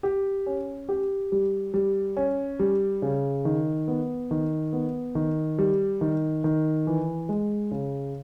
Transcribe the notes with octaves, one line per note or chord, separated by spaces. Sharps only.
G4
C#4
G4
G3
G3
C#4
G3
C#3
D#3
B3
D#3
B3
D#3
G3
D#3
D#3
E3
G#3
C#3